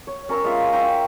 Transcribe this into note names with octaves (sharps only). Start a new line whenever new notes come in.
C#5
C#4 A#4 C#5 E6
G#3 F4 E5
E5 F5 G5 A#5